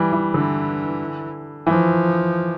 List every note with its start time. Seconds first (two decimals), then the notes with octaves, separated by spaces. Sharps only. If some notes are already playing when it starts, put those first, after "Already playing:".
Already playing: E3 G3
0.12 E3
0.34 D3 E3
1.67 E3 F3